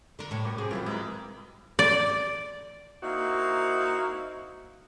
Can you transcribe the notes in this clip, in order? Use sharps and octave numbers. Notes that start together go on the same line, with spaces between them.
D3 A#4
A2 C3 C#5
F#2 D6
C4 G4 G#4
D#2 E3 F#3 E4 F4 D6
G#3 D#4 E4
D5
A#3 C4 D#4 E4 F#4